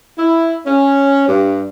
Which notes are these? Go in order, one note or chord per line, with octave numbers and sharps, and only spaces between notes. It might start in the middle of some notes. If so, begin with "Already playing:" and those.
E4
C#4
G2